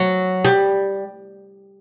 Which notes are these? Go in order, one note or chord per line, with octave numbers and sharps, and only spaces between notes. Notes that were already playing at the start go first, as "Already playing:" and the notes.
Already playing: F#3
G3